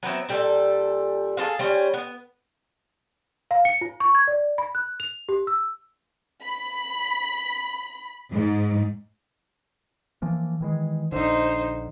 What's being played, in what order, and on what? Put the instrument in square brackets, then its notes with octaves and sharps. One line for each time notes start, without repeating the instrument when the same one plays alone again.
[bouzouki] F#3 B3 C4 E5
A#2 G3 A4
G#4 A4 C5 F5
G3 C#4 C5
B3
[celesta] F5
C#7
F4
C#6
G#6
D5
B5
F#6
F7
G4
E6
[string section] B5
G#2
[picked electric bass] E3 F3 A#3
D#3 E3 G#3
[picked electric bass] A#1 D3 [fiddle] D#4 C5